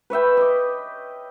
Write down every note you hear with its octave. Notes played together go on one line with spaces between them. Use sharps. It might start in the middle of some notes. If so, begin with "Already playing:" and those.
B4 C#5 E5 G5
D#5 D6